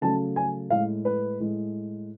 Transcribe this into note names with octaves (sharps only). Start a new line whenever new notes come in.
C#3 F#3 A3 A5
G#5
A2 G#3 F5
B4
A2 G#3